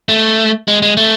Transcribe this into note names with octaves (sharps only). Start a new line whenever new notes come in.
A3
G#3
G#3
A3